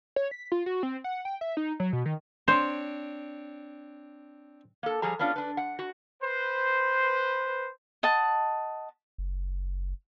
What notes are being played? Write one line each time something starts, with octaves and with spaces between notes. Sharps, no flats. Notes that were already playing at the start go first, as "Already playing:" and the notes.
C#5
B6
F4
F#4
C4
F#5
G5
E5
D#4
F#3
B2
D#3
C4 D4 C5 C#5
A#3 A4
F3 G3 G#4 A#5
B3 C#4 D4 F4
D4 B4
F#5
F#4
B4 C5
D#5 F#5 A5
F#1